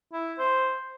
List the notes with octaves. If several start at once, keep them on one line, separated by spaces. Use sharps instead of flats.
E4
C5